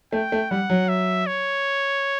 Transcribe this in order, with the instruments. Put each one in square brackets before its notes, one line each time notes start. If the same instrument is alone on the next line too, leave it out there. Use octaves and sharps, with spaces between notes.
[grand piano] A3 [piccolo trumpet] G5
[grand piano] A3
[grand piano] G3 [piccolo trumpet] F#5
[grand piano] F#3
[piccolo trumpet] E5
C#5